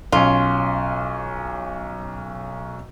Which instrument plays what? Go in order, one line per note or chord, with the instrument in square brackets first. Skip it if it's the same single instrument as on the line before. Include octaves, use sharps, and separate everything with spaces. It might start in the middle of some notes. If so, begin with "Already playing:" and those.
[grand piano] B1 C#4 [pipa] F4